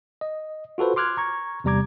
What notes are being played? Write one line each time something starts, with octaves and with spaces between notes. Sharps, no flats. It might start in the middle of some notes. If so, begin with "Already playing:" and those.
D#5
F4 F#4 A4 B4 C5
C6 D6 F6 F#6 G#6
A#5 C#6 G#6
E2 C3 G3 A#5 D6 G#6